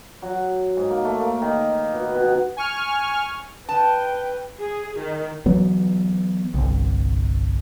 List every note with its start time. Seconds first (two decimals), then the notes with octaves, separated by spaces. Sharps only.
0.22 F#3
0.77 G#2
0.90 A#3
1.05 A3
1.20 A#3
1.42 D#3
1.93 B2
2.15 B2
2.57 G#5 C#6 F6
3.69 B4 G5 A5
4.59 G#4
4.99 D#3
5.46 E3 F#3 B3
6.54 G1 C2